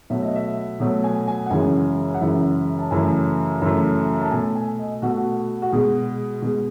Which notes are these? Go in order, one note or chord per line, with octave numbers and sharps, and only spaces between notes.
B2 F#3 A3 E5
D#5
E5
B2 F#3 A3
G#5
G#5
F#5
F#2 C#3 E3 G#3 G#5
F#5
F#2 C#3 E3 G#3 E5
A5
F#2 C#3 E3 A3 G#5
F#2 C#3 E3 A3
A5
B2 A3 G#5
G#5
D#5
B2 A3 F#4
F#4
F#4
B2 G#3 G#4
B2 G#3